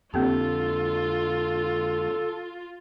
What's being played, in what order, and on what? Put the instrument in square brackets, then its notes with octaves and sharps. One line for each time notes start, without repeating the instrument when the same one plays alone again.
[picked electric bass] F2 D3 [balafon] A#3 C4 G4 [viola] F4 [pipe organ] A4